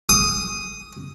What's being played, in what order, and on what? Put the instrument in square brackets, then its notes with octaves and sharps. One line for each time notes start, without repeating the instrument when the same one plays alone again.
[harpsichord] D#6